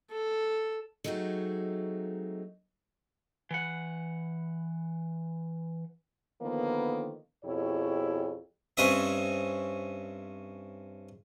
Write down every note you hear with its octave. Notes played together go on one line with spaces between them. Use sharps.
A4
F#3 G#3 A3 C4 D#4 F#4
E3 F#5
D3 D#3 F3 A#3 B3
F2 B2 E4 G4 G#4 C#5
G2 C4 C#4 D#5 E5